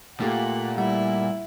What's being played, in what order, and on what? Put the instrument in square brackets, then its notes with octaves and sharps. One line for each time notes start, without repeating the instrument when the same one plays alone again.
[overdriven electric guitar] A#2 [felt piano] A3 F4 G4 [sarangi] F#5
[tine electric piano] G3 F#5 [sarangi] E4